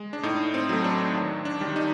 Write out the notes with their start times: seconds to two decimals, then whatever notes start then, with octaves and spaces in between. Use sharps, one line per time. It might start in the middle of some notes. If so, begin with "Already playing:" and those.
Already playing: G#3
0.13 D4
0.23 A2 D#4
0.54 C4
0.69 F#3 A3
0.84 D4
1.14 D#2
1.45 D4
1.61 D#3 G3
1.76 D#4